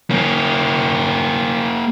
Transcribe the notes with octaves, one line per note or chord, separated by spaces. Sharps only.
A#3 C#4